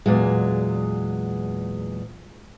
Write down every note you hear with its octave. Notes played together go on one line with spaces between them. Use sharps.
E2 A#2 F#3 G#3